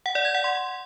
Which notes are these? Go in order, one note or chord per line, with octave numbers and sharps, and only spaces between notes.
F#5
D5
G#6
F#5
C6